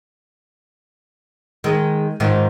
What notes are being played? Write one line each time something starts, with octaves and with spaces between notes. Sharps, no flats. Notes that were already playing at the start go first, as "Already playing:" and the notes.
D#3 G#3
G#2 D#3 F3